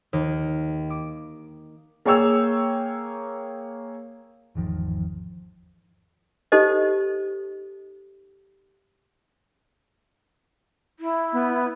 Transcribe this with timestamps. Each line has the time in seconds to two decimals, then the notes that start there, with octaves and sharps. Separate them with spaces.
0.13 D#2
0.90 D6
2.05 A#3 G#4 C#5 G5 E6 F7
4.55 G#1 E2 D#3 F3
6.52 D#4 G4 A4 C5 D#5
11.00 E4
11.32 B3